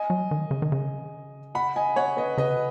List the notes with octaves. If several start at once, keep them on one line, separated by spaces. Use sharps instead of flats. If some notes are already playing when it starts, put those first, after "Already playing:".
Already playing: D#5 G#5
F#3
D#3
C#3
D#3
C#3
F#5 B5
D#5 G#5
C#5 F#5
B4 D#5
C#3 B4 D#5